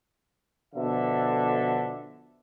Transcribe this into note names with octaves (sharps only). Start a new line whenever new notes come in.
B2 D3 F3 A4 E5